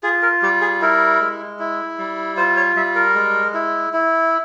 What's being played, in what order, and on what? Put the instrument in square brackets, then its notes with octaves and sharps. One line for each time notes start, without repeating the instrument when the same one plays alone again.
[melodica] F4 G#4
A#4
G3 G4
G#4
E4 A#4
G#3
E4
G3
F4 C5
C#5
G3 E5
A#4
G#3
E4
E4